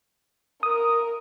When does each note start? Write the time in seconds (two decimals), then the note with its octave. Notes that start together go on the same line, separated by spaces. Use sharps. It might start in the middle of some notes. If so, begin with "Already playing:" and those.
0.63 A#4 D#6